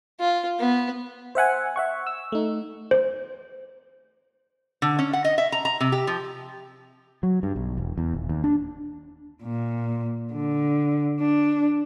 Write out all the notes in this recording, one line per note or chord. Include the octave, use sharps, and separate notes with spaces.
F4
B3
C5 E5 F#5 G#5
E5 F#5 C#6
E6
A3 D#4
C5
D3
C#4
F#5
D#5
E5
A#5
A#5
C3
G4
F3
F#3
G2
B1
E1
E2
D#1
D#2
D4
A#2
D3
D4